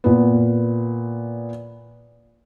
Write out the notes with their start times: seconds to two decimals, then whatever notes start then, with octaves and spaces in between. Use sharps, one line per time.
0.04 A#2 B3